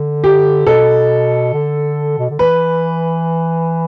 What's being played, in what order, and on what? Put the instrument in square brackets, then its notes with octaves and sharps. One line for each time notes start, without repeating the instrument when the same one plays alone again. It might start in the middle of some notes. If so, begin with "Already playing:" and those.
Already playing: [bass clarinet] D3
[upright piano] G4
[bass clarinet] B2 [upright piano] A4
[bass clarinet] D3
B2
D3
[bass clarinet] E3 [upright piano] B4